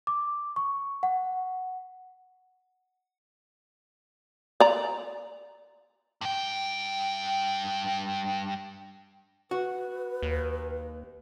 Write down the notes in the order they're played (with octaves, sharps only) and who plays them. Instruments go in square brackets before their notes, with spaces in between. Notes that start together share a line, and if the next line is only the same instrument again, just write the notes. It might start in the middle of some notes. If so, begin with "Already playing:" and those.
[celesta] D6
C#6
F#5
[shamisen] D5 A#5
[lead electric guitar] G2 G5
[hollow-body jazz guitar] F#4 [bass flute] B4
[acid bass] D#2